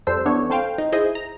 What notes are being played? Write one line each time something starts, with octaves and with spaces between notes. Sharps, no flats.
F2 G3 A4 C5 E6
E3 B3 D4 A4 C#5
C4 A4 C5 F5 G5
D#4
E4 G#4 C5 D#5
A#5